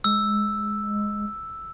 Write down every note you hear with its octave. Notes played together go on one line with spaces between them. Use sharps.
G#3 E6